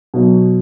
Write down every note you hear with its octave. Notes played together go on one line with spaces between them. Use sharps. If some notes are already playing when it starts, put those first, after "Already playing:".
B2 F#3